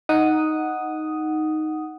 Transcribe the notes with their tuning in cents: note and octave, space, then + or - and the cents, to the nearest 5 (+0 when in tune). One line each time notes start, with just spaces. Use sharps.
D#4 +0 F#5 +0 D#6 +0